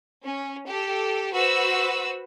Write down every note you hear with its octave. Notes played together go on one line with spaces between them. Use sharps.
C#4
G4 A4
F#4 B4 C5 E6